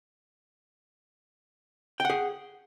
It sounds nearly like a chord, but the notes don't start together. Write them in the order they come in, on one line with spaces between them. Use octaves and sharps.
G5 F#5 G#4